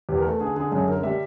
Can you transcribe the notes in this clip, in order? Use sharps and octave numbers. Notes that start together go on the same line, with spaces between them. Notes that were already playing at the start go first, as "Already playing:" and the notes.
E2 G4
A#4
A3 A4
D3 G#4
D3 G#4
F#2 G#4
D3 A#4
G3 E5